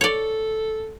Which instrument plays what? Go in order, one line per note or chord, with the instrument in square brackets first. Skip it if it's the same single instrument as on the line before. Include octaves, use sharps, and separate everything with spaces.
[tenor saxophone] A4 [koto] C#5 D5